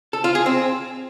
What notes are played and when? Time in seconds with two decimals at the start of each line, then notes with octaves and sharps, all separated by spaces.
0.13 A4
0.24 F4
0.35 G#4
0.46 C4